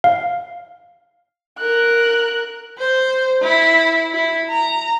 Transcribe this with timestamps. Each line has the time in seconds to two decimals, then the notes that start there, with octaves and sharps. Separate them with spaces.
0.04 F5
1.59 A#4 F#6
2.78 C5
3.42 E4
4.13 E4
4.49 A#5